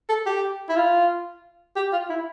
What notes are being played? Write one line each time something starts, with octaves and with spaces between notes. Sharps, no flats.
A4
G4
E4
F4
G4
F4
E4